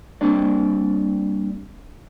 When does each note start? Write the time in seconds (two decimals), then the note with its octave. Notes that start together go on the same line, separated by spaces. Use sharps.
0.21 G3 A#3 C4 D4 D5